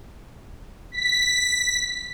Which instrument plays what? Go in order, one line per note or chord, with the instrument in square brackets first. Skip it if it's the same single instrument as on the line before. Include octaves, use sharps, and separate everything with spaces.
[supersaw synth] B6